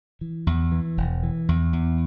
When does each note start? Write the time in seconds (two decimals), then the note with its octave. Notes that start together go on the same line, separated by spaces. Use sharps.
0.21 E3
0.47 E2
0.72 E3
0.97 E1
1.23 E3
1.48 E2
1.73 E2